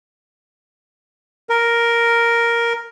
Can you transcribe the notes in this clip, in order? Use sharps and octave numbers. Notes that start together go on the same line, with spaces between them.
A#4